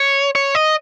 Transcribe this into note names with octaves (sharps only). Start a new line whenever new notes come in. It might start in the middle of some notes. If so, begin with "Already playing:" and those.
Already playing: C#5
C#5
D#5